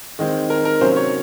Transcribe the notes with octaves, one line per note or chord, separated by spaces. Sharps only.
D#3 G#3 C4
A#4
A#4
C3 F#3 A#3 C#4 C5
C#5